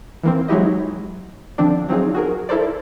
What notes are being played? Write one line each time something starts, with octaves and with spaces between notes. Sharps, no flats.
E3 A#3 C4
F#3 G#3 D#4 E4 G4 D#5
D3 F3 C4 D4
F#3 C4 D#4 F4 G#4
F#4 G#4 A#4
E4 A4 A#4 C5 D5